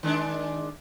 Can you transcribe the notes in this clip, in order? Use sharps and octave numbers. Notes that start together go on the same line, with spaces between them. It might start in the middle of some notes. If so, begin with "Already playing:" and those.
D#3 G#3 D4